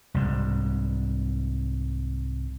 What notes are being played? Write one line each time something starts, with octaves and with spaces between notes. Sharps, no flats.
C2 G#2